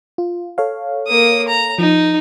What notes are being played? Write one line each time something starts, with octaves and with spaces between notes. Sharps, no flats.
F4
A4 C#5 F5
A#3 D#6
A#5
F3 D#4